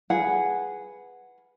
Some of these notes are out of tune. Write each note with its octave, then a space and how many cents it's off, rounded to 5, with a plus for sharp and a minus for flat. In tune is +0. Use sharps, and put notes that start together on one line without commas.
G#4 +0 B4 +0 F#5 +0